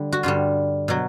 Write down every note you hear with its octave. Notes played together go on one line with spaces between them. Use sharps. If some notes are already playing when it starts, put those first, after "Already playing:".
Already playing: D3 G3
F#4
G2 D3 G3 F4
B2 F#3